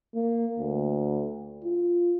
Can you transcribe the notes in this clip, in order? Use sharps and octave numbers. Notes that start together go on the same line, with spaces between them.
A#3
D2
F4